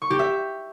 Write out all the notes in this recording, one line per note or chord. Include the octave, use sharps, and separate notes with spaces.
C#6
G4
E5